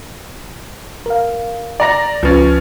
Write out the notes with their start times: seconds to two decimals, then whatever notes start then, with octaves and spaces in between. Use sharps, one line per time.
1.06 A#4 F5
1.80 D5 A#5 A#6
2.23 C#2 F3 C#4 B4 A6